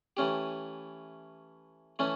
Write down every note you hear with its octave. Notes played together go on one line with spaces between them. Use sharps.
E3 A3 C#4 G4
E3 A3 C#4 E4